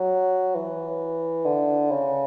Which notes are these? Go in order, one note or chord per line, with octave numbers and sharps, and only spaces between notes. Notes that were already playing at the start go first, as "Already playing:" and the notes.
Already playing: F#3
E3
D3
C#3